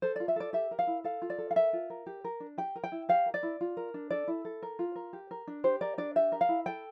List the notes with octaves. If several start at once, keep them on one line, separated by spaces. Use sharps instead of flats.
A4 C5
D5
F4
E5
A4 D5
G4 E5
A#4
F5
E4
A4 F5
F4
D5
A4
F5
A#4 E5
F4
A#4
G4
A#4
D4
G4 G5
A#4
G5
E4
G4 F5
A#4
D5
E4
F4
A#4
D4
A4 D5
E4
A4
A#4
F4
A#4
G4
A#4
D4
G4 C5
A#4 D5
D4 D5
G4 E5
A#4
F5
E4
A4 G5